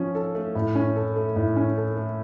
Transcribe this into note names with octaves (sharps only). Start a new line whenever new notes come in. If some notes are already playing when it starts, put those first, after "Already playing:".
Already playing: F3 C#4
A4
A3
A2
C#4
A4
A3
A2
C#4
A4
A3